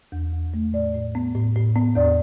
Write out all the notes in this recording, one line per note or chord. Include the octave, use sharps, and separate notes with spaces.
E2
E2
A3
A2 D5
A2
B3
A2
A2
B3
E2 D5